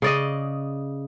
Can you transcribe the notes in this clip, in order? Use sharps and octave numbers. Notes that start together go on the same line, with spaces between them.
C#3 D5 D#5